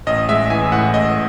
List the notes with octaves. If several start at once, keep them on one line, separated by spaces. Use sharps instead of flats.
A1 D#5
G#3 E5
E3 G#5
A2 F#5
A1 D#5